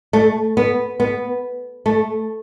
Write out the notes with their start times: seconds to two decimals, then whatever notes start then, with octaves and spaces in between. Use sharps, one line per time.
0.13 A3
0.57 B3
1.00 B3
1.86 A3